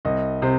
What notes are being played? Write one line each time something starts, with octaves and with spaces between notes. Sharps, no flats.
C2 D#5
C3 C5